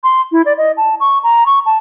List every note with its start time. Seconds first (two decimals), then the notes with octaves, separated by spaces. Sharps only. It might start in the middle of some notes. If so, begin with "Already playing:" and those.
0.04 C6
0.32 E4
0.46 D5
0.58 D#5
0.77 A5
1.00 C#6
1.23 A#5
1.46 C#6
1.66 A5